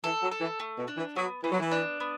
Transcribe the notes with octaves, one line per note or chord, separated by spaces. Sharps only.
E3 A4
F#3
A4
E3
A3
B2
D4
E3
F#3 B3
E3 B3
F#3
E3
D4
B3